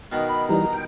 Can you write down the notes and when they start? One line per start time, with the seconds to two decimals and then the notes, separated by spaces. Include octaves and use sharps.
0.12 B2 D#3 D#6
0.29 B5
0.49 E3 G3 D#4 A#5
0.73 G5